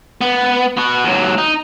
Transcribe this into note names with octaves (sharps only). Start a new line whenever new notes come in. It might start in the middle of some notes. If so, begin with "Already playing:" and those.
B3
B3 F#4
D#2 F#3
D#4